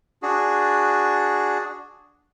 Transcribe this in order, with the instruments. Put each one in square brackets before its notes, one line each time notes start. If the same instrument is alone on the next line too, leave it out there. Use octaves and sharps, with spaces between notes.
[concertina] D4 F#4 G#4